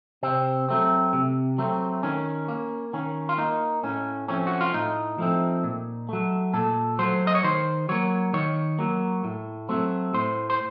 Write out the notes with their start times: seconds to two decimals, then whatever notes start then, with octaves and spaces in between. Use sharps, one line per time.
0.23 C3 C4
0.69 F#3 A3 C4
1.13 C3
1.58 F#3 A3 C4
2.03 D#3 C#4
2.48 A#3
2.93 D#3 C#4
3.29 F4
3.38 A#3 D#4
3.83 A2 C#4
4.28 F3 A3 C4 C#4
4.47 F#4
4.61 F4
4.73 A2 D#4
5.18 F3 A3 C4
5.64 A#2
6.09 F#3 A3
6.53 A#2 A4
6.99 F#3 A3 C5
7.27 D#5
7.35 C#5
7.44 D#3 C5
7.89 F#3 A#3 C#5
8.34 D#3 C#5
8.79 F#3 A#3
9.24 A2
9.69 F#3 A3 C4
10.14 A2 C5
10.50 C5